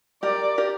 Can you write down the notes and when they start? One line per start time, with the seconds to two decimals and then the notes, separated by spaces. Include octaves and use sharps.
0.23 G4 A#4 D5
0.58 G4 A#4